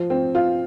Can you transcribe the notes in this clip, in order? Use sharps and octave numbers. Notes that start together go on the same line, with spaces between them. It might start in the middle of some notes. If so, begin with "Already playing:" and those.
Already playing: F3
C4
F4